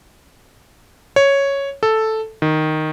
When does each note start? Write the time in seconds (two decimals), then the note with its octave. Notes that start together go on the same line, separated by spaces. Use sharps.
1.16 C#5
1.83 A4
2.42 D#3